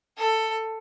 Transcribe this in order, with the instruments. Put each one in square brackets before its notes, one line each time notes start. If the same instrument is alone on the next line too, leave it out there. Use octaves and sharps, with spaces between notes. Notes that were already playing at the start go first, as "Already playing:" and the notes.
[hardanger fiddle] A4